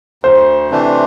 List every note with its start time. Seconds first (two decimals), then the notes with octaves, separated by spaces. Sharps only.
0.23 D2 C5
0.70 C3 E3 A3 D4